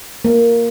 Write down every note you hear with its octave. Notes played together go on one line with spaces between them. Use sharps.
A#3